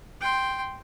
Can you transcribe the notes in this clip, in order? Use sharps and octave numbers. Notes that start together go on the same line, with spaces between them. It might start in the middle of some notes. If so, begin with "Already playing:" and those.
G5 C6